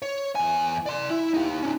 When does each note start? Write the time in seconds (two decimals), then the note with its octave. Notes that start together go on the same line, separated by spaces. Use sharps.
0.02 C#5
0.35 E2 G#5
0.86 D5 C6
1.10 E4
1.34 D#4 G4
1.62 C#4 D#4